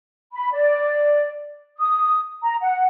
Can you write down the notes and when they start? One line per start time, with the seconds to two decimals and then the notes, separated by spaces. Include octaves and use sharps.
0.34 B5
0.53 D5
1.78 D#6
2.44 A#5
2.62 F#5